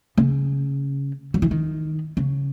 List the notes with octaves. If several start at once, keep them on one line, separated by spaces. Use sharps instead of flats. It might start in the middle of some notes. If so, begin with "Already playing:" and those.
C#3
F#3
E3
D#3
C#3